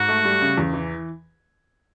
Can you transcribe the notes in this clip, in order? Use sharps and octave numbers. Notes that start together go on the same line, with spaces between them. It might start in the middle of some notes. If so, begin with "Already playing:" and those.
Already playing: G#2 F#4
A3
G3
C#3
E2
E3